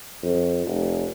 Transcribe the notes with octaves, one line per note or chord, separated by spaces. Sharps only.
F2
F1